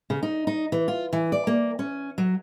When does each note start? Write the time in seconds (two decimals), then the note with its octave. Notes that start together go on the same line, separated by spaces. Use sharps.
0.10 C#3
0.23 D#4
0.47 D#4
0.72 E3
0.88 F4
1.13 E3
1.32 D5
1.47 A#3
1.79 C#4
2.18 F#3